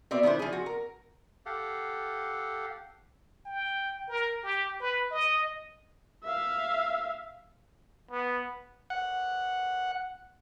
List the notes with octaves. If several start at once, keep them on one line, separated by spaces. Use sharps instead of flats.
B2 C4 D5 E5
D#3 F3 D4 E4 C5
F3 G#4
F#4
A#4
G4 A4 F5 F#5
G5
A#4
G4
B4
D#5
E5 F5
B3
F#5